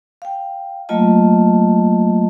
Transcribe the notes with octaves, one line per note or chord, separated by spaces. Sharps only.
F5 G5
F#3 A3 A#3 F4 D#5 A5